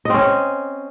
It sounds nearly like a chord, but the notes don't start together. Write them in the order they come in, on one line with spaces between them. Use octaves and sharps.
D#5 C4 C#4